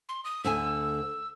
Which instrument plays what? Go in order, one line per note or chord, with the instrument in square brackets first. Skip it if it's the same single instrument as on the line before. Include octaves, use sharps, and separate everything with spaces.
[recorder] C6
D#6
[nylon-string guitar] D2 D3 G#5 [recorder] E6